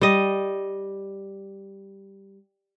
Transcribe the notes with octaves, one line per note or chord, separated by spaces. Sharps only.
G3 D#5